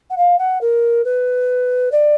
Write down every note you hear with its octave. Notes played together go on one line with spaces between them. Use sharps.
F#5
F5
F#5
A#4
B4
D5